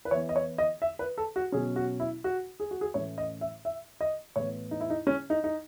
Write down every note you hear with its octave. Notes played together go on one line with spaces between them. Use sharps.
B4
E3 B3 C#5
D#5
C#5
D#5
E5
B4
A4
F#4
B2 F#3 C#4 G#4
F#4
E4
F#4
G#4
F#4
G#4
A2 E3 A3 C#4 C#5
D#5
E5
E5
D#5
A2 E3 B3 C#5
D#4
E4
D#4
C#4
D#4
D#4